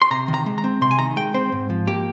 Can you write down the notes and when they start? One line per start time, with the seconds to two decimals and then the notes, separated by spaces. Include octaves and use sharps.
0.02 C6
0.11 C3 A#5
0.28 D#3
0.34 A#5
0.46 G#3
0.58 A#5
0.64 C4
0.81 C3 C6
0.91 G#5
0.99 D#3 A#5
1.16 G#3 G5
1.34 C4 C5
1.52 G#2
1.70 F3
1.87 A#3 G4